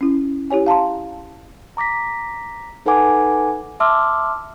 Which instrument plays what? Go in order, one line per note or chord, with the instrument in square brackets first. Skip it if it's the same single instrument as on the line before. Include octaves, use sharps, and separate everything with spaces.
[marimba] C#4 E4
E4 G4 C#5 G#5
F5 A5 A#5 C6
[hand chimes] A#5 D6 A#6 B6
D#4 A4 B4 F#5 G#5 D6
[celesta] E5 A5 C6 D6 E6 F6